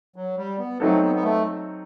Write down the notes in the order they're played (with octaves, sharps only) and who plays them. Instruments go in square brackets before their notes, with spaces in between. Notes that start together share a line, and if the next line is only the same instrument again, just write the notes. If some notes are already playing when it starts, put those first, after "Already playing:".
[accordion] F#3
G3
B3
[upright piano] F#3 C4 D#4 A4 [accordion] A3
[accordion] B3
B3
A3